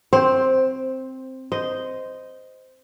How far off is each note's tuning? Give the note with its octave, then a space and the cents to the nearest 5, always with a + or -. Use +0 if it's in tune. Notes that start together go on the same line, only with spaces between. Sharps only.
C4 +0 C5 +10
C5 -10 D#5 +0